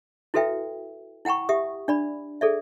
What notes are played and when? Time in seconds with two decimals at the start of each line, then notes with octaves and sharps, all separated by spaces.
0.34 E4 F#4 A4 B4 E5 G5
1.25 E4 F#5 G5 A#5 C#6
1.49 G4 E5 D#6
1.88 D4 D5 B5
2.41 G#4 A4 D5 E5